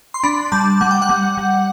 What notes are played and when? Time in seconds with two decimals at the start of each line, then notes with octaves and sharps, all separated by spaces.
0.14 C6
0.23 D4 B5
0.52 G3 A5
0.81 G3 F#5
0.91 G5
1.02 F#5
1.09 G3
1.37 G3